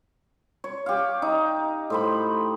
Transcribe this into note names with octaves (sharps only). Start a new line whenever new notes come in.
C#5
G4 F5
D#4
A2 C5 B5